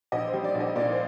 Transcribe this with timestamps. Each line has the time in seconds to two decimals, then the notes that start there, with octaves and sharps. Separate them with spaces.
0.12 A#1 D#5
0.28 C5
0.33 G3
0.44 D5
0.55 A#1
0.60 D#5
0.76 A#2 D5
0.92 C5